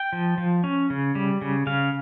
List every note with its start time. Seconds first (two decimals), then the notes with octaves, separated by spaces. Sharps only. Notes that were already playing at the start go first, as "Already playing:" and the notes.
Already playing: G5
0.13 F3
0.38 F3
0.64 C#4
0.90 C#3
1.15 G3
1.41 C#3
1.67 C#3 F5